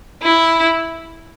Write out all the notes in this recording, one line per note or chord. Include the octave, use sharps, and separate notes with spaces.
E4